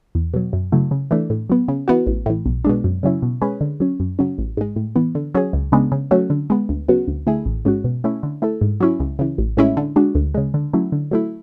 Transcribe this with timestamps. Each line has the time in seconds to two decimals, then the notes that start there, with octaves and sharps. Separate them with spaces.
0.15 E2
0.34 B2 F#3
0.53 F#2
0.72 C#3 F#3 A3 E4
0.91 C#3
1.11 E3 A3 D4
1.30 A2
1.50 F#3 B3
1.68 C#3
1.88 E3 B3 F#4
2.07 A1
2.26 A2 E3
2.46 B1
2.64 B2 G#3 D4
2.84 F#2
3.03 C#3 F#3 C#4 E4
3.22 B2
3.42 G#3 C#4 G#4 B4
3.61 D3
3.80 F#3 C#4
4.00 F#2
4.19 C#3 F#3 C#4
4.38 A1
4.57 G#2 G#3
4.76 A2
4.96 E3 B3
5.15 D3
5.35 F#3 C#4 G#4
5.53 C#2
5.72 C#3 G#3 B3 D4
5.92 C#3
6.11 F#3 A3 C#4 F#4
6.30 D3
6.50 G#3 B3
6.69 D2
6.88 C#3 F#3 B3 F#4
7.08 D2
7.27 D3 A3 E4 G#4
7.46 A1
7.65 G#2 G#3 C#4 F#4
7.84 B2
8.04 A3 C#4 E4
8.23 D3
8.42 A3 E4 A4
8.61 G#2
8.80 F#3 C#4 E4
9.00 C#2
9.19 C#3 E3
9.38 A1
9.57 A2 G#3 C#4 E4
9.77 D3
9.96 G#3 D4 F#4
10.15 D2
10.34 C#3 G#3
10.54 D3
10.73 F#3 A3 C#4 E4
10.92 D3
11.11 F#3 A3 E4